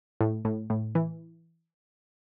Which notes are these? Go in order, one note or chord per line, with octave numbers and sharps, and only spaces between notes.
A2
A2
A2
E3